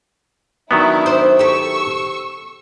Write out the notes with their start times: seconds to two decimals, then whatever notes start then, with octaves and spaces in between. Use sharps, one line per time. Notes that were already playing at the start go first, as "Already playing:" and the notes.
0.71 D#3 F#3 B3 D4 E4
1.06 C5
1.39 G4 A4 C#6 E6